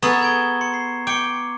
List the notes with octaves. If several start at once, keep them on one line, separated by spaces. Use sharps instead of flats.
B3 G#4 A4 A#5 C#6 E7
G#6 D7 G7
C6 C#7
C7
G5 D6 C#7